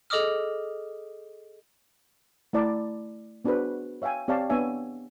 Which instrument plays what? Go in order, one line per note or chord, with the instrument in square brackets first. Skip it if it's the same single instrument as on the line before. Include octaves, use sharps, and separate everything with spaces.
[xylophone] G#4 A4 D#5 D6 D#6 F6
[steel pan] A3 E4 D5 A5 A#5
B3 D4 F#4 G#4 B4 C5
C#5 E5 F5 G5 G#5
C4 G4 C#5 D5 F5 A5
B3 D4 C#5 E5 G#5